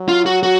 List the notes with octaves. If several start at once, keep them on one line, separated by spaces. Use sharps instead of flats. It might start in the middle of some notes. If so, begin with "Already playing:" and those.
Already playing: F#3
F4
F#4
F#4